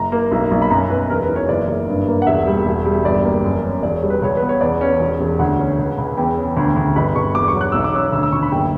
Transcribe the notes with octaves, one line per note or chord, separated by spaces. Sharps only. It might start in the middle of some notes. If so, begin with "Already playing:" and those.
Already playing: F#1 A#5
A#3
B1
B1
B5
F#2 A#5
F#2 B4
E1 A#4
B4
E3
C#5
F#1 D5
F#1
G2
A#3
F#5
E1 E5
G3
E1
G3
G1 D5
A#3
F#2
C#4
E1 D5
C#5
G3
B4
C#2 C#5
B3 B4
C#5
E2 D5
C#4
E1
E1
D2 F#5
C#4
C#2
C#2
E2 G5
C#4
D2
D2
G1 B5
G1 C#6
E1 D6
C#6
F#3
F#6
B1 E6
D6
C#4 E6
D2 E6
E6
D2 C#6
B5
F#1 G5